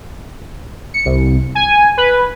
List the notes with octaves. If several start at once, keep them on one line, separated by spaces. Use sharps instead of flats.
C#7
C2
G#5
B4